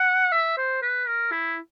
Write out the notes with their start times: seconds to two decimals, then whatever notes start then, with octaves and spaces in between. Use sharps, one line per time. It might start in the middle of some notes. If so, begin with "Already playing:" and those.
Already playing: F#5
0.32 E5
0.57 C5
0.82 B4
1.07 A#4
1.31 E4